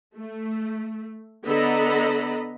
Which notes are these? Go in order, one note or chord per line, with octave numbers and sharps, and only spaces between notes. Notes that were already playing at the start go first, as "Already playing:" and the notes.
A3
D3 B3 A4 D#5 A#5 B5